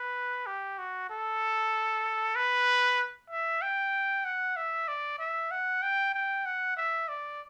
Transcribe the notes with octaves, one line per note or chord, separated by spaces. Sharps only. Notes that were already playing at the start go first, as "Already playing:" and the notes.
Already playing: B4
G4
F#4
A4
B4
E5
G5
F#5
E5
D5
E5
F#5
G5
G5
F#5
E5
D5